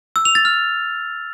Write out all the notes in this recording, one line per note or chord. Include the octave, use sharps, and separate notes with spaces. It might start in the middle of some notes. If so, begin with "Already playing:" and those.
E6
F7
A6
F6